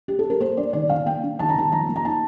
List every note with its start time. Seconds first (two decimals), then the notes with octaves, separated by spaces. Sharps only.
0.08 G4
0.19 A4
0.30 A#4
0.40 A#3 C5
0.57 D4 D5
0.73 D#3 D5
0.89 D#3 F5
1.06 A#3 G5
1.23 D4
1.39 D#3 A5
1.49 A#5
1.56 D#3 A5
1.72 F3 A#5
1.89 A#3
1.96 A#5
2.05 D#4 A5